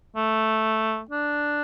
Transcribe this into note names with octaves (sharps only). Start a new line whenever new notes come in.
A3
D4